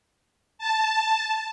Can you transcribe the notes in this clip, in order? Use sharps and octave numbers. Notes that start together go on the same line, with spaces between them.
A5